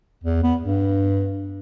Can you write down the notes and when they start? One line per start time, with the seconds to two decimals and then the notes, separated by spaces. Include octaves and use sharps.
0.24 E2
0.43 B3
0.61 G2